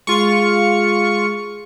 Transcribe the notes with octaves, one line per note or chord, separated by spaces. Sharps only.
G#3 F4 G#4 C#6